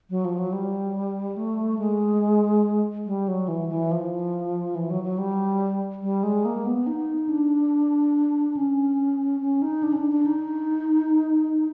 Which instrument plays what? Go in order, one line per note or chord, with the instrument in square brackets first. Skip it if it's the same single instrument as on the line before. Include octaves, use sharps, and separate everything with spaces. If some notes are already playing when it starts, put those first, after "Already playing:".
[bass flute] F#3
F3
F#3
G3
A3
G#3
G3
F#3
E3
E3
F3
E3
F#3
F#3
G3
G3
G#3
A#3
B3
D#4
D4
C#4
C#4
D#4
D4
C#4
D4
D4
D#4